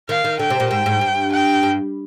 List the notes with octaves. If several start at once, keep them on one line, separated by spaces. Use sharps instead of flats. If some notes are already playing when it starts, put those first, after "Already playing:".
D#3 F5
D#3
D3 G5
C3
A#2
G#2 G5
G#2
G2
G5
G2